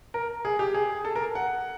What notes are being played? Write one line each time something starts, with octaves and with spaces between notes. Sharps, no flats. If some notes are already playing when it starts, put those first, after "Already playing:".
A#4
G#4
G4
G#4
A4
A#4
F#5